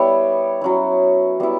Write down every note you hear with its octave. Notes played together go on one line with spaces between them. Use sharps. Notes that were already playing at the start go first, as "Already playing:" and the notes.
Already playing: G3 B3 E4 C#5
F#3 C#4 E4
G3 B3 E4